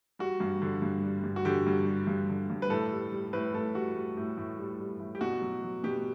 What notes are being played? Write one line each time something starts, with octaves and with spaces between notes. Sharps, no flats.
G3 F#4
G2
D3
G2
G3
G2
F#4
D3 G4
G2
G3
G2
D3
G2
B4
A2 A4
G3
G3
A2 B4
A2 A4
G3 F#4
G3
A2
A2
G3
G3
A2
G4
B2 F#4
F#3
F#3
B2 G4